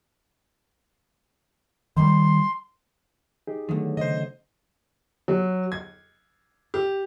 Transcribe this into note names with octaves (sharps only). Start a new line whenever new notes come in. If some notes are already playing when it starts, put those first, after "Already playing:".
D#3 G3 C6
D#4 G4 G#4
D3 D#3 F#3 A3 B3
C#3 C5 D#5
F#3
G#6
G4